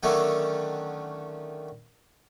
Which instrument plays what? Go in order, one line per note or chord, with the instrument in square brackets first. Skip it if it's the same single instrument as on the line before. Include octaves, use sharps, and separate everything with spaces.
[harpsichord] D3 D#3 F#3 A3 C#4 D4